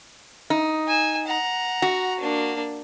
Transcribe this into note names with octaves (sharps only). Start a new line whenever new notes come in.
D#4
G#5 E6
F#5 A#5
F#4
A#3 D4